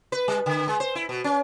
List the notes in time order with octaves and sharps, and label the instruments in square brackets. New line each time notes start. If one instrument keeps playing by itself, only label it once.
[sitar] B4
G3
D3
G#3
C5
E4
B2
C#4